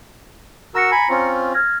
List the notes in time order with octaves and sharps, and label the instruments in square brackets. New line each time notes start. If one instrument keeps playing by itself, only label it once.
[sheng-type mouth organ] F#4 A#4 E6 [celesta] A#5 A#6 C#7
[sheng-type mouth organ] G#5 B5
C4 C#4 F4
[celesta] F6 G#6 A#6